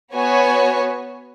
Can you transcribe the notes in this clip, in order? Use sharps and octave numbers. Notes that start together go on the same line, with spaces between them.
B3 F#4 C#5 G#5